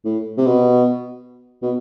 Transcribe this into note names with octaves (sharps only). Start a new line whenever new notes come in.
A2
C3
B2
B2